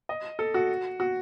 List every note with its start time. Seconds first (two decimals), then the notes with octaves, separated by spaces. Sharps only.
0.09 D#5
0.39 A4
0.54 F#4
1.00 F#4